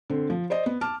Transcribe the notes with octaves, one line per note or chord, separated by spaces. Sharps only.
D3 C4
F3
C5 D5 D#5
B3
A5 D6 F6